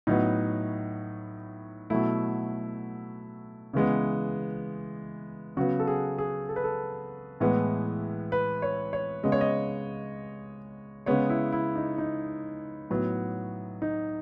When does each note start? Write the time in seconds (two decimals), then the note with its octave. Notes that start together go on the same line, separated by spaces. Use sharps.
0.07 A2 F#3 B3 D#4
1.90 B2 F#3 A3 E4
3.73 C#3 E3 G#3 B3
5.57 C#3 F#3 B3 F#4
5.79 A4
5.87 G#4
6.18 G#4
6.49 A4
6.56 B4
6.64 A4
7.40 A2 E3 G#3 B3
8.32 B4
8.62 C#5
8.93 C#5
9.23 C#3 G#3 B3 D#5
9.32 C#5
9.41 D#5
11.06 C#3 G#3 B3 C#5
11.30 E4
11.52 E4
11.76 D#4
11.98 D#4
12.90 A2 F#3 B3
13.82 D#4